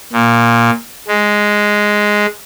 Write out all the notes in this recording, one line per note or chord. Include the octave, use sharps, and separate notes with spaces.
A#2
G#3